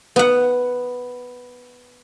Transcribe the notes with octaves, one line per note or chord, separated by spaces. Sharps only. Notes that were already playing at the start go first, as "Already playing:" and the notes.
B3 F#5